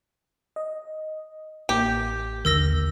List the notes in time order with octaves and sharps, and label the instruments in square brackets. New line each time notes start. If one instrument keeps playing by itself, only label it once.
[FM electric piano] D#5
[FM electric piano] A1 A#3 G6 [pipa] G4
[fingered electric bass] D#2 D3 [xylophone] A#4 E6 A#6